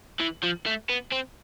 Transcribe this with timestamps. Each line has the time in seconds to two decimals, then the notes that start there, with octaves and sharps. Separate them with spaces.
0.20 E3
0.44 F3
0.66 A3
0.89 B3
1.12 C4